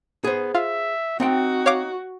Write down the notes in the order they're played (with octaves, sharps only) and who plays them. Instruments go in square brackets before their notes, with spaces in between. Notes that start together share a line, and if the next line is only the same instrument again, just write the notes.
[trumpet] B3 [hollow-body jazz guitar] G#4 C5
[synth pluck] F4 [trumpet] E5
[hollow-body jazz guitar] C4 F#5 G5 [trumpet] D#4 [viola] F#4
[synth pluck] C#5 F5 D6